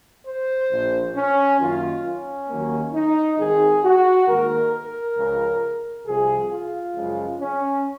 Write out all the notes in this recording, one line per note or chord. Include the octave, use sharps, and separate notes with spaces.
C5
A#1 A#2 F3
C#4
F#2 D#3 A#3 F4
C#4
D#2 D#3 F#3 A#3
D#4
G#1 G#2 D#3 G#3 G#4
F#4
G#2 D#3 A#3 A#4
A#4
C#2 C#3 F3
C2 C3 F3 G#4
F4
F#2 C#3 F3 G#3
C#4